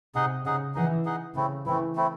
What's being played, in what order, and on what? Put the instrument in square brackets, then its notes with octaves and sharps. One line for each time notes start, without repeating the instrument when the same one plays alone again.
[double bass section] C3 [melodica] D#4 G#4 D#5 F#5
[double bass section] C#3 [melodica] D#4 G#4 D#5 F#5
[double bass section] E3 [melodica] D#4 G#4 D#5 F#5
[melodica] D#4 G#4 D#5 F#5
[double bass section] C#3 [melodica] A3 C4 E4
[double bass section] E3 [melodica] A3 C4 E4
[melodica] A3 C4 E4